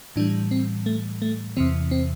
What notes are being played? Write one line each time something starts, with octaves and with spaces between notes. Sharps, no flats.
A2 E3 G3 D4
C4
A3
A3
E2 C3 E3 C4
C4